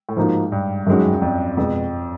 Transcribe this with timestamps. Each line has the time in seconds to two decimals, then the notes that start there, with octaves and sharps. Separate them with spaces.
0.09 A2
0.17 G#2 F3 A#3 D#4 F#4
0.52 G2
0.87 F#2 D#3 G#3 C#4 F#4
1.13 F#2
1.22 F2
1.57 F2 B2 G#3 B3